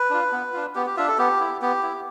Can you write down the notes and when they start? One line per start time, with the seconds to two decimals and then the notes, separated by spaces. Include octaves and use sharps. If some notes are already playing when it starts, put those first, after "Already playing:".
Already playing: B4
0.10 D4 F4
0.32 B3
0.53 D4 F4
0.75 B3 G4
0.86 G4
0.97 D4 F4 E5
1.08 A4
1.18 B3 G4
1.41 E4
1.62 B3 G4
1.83 E4